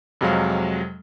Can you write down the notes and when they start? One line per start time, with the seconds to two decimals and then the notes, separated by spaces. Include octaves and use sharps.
0.21 F2 C3 F#3 G#3 F5